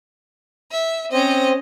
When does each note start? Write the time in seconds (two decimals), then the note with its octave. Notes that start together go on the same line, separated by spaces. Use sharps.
0.72 E5
1.12 C4 C#4 C5 D#5